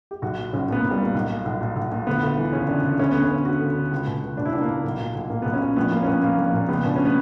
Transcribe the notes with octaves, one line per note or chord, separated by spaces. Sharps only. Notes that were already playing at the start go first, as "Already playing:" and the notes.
G4
B1 F#4
A#2
B1 C#4
A#2 B3
A#3
B1
G3
A#2 A#3
B1
A#2
B1
A#2
B1
A#2
D2 B3
D2
E3
C#3 C#4
D2 D4
D2
D2 C#4
D3 B3
C#4
D2
D3 F#4
D2
D3
C#2
B2
C#2
B2 D4
E4
C#2 D4
A#3
B2
B1
A#2
B1
A#2 A#3
B1 B3
C#4
A#2
A#1 B3
A#2 A#3
C#4
A#1 B3
A#2 A#3
A#1
A#3
A#2
C#2 B3
B2 D4
C#4
B3